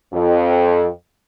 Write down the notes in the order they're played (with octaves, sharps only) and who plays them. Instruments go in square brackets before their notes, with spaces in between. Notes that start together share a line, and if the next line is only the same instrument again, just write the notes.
[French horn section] F2